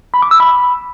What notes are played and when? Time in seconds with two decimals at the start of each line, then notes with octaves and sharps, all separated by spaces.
0.14 B5
0.22 D6
0.31 E6
0.40 B5